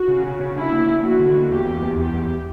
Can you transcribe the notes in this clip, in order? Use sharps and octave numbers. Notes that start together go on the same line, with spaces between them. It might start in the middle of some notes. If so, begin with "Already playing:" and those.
Already playing: F#4
C#3
C#3
C#3
D4 E4
A#3
D4
A#3 F#4
D3
A#3
E2 G4
E2
E2
E2 G4
E2